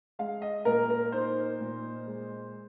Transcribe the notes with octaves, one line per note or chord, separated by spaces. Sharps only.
G#3 F5
D#5
A#2 A#4
A#4
D#4 C5
A#2
G#3